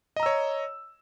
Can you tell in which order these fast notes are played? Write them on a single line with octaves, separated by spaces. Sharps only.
D#5 A#5 E6 C#5